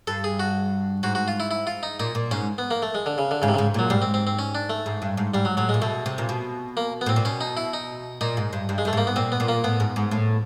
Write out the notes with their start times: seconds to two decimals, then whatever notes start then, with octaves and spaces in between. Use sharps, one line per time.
0.07 G2 A4
0.24 G#4
0.40 F#4
1.03 G#2 F#4
1.15 F#4
1.28 F4
1.40 E4
1.51 E4
1.67 F4
1.83 D#4
2.00 A#2 D#4
2.15 A#2
2.31 G#2 C#4
2.58 B3
2.71 A#3
2.82 A3
2.95 G#3
3.06 D3
3.18 C#3
3.31 D3
3.42 G#2 C#3
3.48 C3
3.54 G#2 C#3
3.74 A#2 F#3
3.90 G#2 G3
4.02 C4
4.14 C4
4.27 C4
4.39 C#4
4.55 D4
4.70 A3
4.86 G#2
5.02 G2
5.17 G#2
5.34 G#2 G3
5.45 F#3
5.57 A2 F#3
5.69 A#2 G#3
5.82 B2 A3
6.06 C3
6.18 A#2
6.29 B2
6.77 A#3
7.01 B3
7.06 A2 C4
7.16 A#2
7.25 B2 C#4
7.41 D#4
7.57 E4
7.73 D#4
8.21 A#2 D#4
8.37 G#2
8.53 G2
8.69 G2
8.78 G#3
8.85 G2
8.88 A3
8.93 G#2 A#3
9.07 B3
9.16 A#2 C4
9.32 B3
9.40 A#2
9.48 A#3
9.64 A2 B3
9.80 G#2
9.96 G#2
10.11 A2